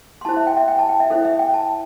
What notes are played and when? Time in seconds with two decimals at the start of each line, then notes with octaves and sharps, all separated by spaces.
0.21 C6
0.25 E4 C5 A5
0.37 E5
0.47 G5
0.57 E5
0.68 G5
0.79 A5
0.89 G5
1.00 E5
1.10 E4 A4 C5 E5
1.25 E5
1.39 G5
1.54 A5